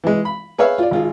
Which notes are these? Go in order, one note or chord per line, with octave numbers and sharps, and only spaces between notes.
E3 G#3
B5
G#4 B4 C#5 E5 F5
F4 D5
G#1 F4 G#4